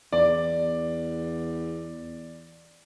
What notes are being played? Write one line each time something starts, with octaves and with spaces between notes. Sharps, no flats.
E2 D5